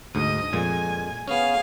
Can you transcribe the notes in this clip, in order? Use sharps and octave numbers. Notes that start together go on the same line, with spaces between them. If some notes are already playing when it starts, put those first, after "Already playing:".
D2 G#2 D#5 D#6
F2 A#2 G#3 G#5
B3 C#4 G#4 F5